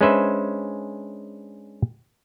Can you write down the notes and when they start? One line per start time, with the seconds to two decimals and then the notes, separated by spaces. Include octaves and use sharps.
0.01 G#3 C#4 D4 B4 C5 E5